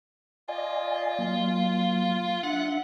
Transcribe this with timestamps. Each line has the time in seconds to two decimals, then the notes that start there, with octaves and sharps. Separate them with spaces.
0.48 F4 D5 D#5 G#5
1.19 F#3 A#3
2.43 D4 E5 F#5